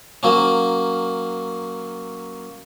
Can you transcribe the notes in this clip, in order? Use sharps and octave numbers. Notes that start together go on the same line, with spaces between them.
F#3 A#3 C#4